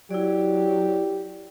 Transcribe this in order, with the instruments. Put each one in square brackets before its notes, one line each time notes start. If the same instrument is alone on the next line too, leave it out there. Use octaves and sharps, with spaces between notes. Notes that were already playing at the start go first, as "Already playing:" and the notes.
[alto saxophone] F#3 [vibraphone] E4 D5 [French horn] G4